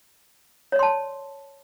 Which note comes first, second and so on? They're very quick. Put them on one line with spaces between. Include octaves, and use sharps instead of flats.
C#5 D5 C6 A5